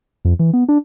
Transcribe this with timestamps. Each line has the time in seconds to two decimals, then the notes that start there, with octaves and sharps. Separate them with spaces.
0.25 F2
0.39 E3
0.53 B3
0.69 D4